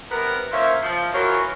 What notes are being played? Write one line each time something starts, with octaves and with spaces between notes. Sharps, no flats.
C3 B3 A#4
A#3 C#4 F4 C5 E5
F3
E3 F#3 F4 A#4 C#5